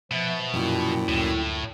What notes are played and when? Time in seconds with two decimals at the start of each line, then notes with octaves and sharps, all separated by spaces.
0.11 B2 F3 E5 A6
0.53 F#2 A#2 F3 E4 G5
1.08 D2 A2